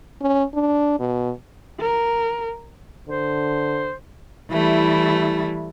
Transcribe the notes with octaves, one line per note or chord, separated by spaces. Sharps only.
C#4
D4
B2
A#4
D3 C5
E3 G3 A3 E4